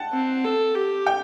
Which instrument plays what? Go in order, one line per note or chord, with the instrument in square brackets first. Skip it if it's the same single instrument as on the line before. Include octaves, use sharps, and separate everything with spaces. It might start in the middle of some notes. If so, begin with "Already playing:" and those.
Already playing: [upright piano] F#5 G5 A5
[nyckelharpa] C4
A4
G4
[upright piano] G5